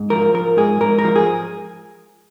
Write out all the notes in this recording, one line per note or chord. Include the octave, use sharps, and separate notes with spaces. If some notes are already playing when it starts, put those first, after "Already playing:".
Already playing: G#2
F3 A#4
F3 A#4
G#2 G#4
G#2 A#4
A#4
F3
G#4